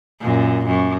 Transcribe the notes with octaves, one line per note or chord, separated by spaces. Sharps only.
F#2 A#2
F#2